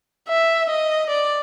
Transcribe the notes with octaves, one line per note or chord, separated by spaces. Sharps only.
E5
D#5
D5